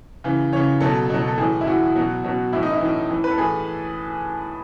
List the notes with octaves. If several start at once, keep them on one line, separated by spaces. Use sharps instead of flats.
C#3 E3
C#3 E3 C#5
B2 F#3 A4
B2 F#3
A4
A2 E3 G#4
E4
A2 E3 F#4
B2 F#3
B2 F#3
A2 E3 E4
D#4
E4
A2 E3
A2 E3
B4
A4
A2 E3 G#4